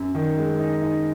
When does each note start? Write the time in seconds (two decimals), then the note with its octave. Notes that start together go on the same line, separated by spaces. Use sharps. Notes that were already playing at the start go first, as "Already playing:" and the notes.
Already playing: F#2
0.15 D#3
0.37 G#3
0.59 D#4
0.82 D#4